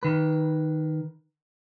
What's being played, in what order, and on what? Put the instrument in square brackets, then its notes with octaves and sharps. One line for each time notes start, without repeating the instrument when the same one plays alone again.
[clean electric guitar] D#3 B4